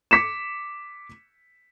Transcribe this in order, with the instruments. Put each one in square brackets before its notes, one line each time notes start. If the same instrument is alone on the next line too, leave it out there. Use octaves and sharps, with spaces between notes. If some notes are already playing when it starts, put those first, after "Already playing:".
[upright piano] D6 B6 C#7 E7